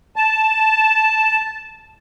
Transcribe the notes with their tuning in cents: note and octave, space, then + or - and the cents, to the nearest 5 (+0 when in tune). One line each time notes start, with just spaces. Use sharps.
A5 -5